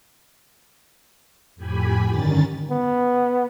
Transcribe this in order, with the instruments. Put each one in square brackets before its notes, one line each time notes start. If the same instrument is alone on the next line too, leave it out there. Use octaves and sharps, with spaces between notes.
[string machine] F2 A2 G4 G#5 B5
G2 D3 D#3 C#4 A#4 A6
[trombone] B3